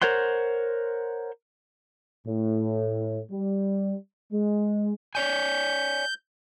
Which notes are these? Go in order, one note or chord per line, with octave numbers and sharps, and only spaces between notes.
A#4 C5 C#5 F#5 C6
A2
G3
G#3
C#5 D5 G#5 G6